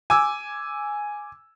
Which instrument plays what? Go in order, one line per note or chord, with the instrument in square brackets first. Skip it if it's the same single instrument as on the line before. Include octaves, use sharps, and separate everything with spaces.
[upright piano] G#5 D6 E6